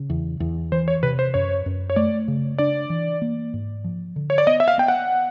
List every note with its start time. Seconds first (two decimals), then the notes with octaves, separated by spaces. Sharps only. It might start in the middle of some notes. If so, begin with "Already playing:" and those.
Already playing: C#3
0.10 E2
0.40 E2
0.72 E3 C5
0.88 C#5
1.03 C3 B4
1.19 C5
1.34 F#2 C#5
1.66 F#2
1.90 C#5
1.96 A3 D5
2.28 C#3
2.58 D4 D5
2.90 E3
3.22 A#3
3.53 G#2
3.84 F3
4.16 D3
4.30 C#5
4.38 D5
4.47 B3 D#5
4.60 E5
4.68 F5
4.78 B3 G5
4.88 F#5